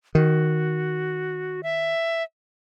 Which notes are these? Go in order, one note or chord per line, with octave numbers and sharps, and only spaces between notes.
D#3 F#4
E5